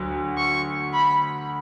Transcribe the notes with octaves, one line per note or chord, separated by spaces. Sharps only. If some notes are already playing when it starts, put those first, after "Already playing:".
Already playing: D2 F#3
C#6
B5